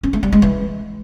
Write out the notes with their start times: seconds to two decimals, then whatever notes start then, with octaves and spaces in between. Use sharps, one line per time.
0.03 C#4
0.13 A3
0.23 G3
0.32 G#3
0.42 E3